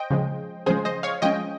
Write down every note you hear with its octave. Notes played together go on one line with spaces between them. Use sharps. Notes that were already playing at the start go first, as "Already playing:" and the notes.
Already playing: C5 D#5 G5
C#3 F3 G#3
C#3 F3 G#3 G#4 C5
C5 D#5
C#5 F5
F3 G#3 C#4 D#5 G5